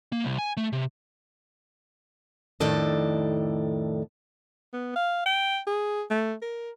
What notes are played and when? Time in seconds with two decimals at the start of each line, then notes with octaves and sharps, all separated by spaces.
0.12 A#3
0.24 C2
0.38 G#5
0.57 A3
0.73 C3
2.60 F2 A2 D#3 D4 A4 D#5
4.73 B3
4.96 F5
5.26 G5
5.67 G#4
6.10 A3
6.42 A#4